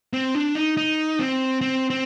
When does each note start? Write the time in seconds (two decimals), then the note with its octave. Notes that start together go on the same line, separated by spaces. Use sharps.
0.13 C4
0.35 D4
0.55 D#4
0.77 D#4
1.19 C4
1.61 C4
1.90 C4